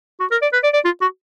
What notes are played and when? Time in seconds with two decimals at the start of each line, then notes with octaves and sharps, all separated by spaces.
0.20 F#4
0.31 A#4
0.42 D5
0.53 B4
0.64 D5
0.74 D5
0.85 F4
1.01 F#4